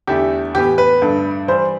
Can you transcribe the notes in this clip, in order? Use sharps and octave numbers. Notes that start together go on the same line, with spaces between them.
E2 D3 A3 E4 G4
A2 E3 B3 G4
B4
G2 D3 A3 D4 A4
E3 G3 D4 C5